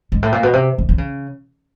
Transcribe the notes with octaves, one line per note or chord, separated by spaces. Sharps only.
G#2
A2
A#2
B2
C3
D#3
D3
C#3